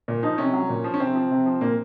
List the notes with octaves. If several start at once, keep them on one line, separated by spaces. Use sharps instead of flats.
A#2
F3 D#4
C3 C#4
F#3
A#2
F3
C#4
C3 C4
F3
C3
F3
A#2 A#3